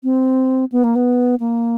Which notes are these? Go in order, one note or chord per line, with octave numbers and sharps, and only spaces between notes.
C4
B3
A#3
B3
A#3